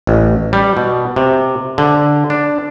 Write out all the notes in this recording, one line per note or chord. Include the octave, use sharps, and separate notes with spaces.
A1
G3
B2
C3
D3
D4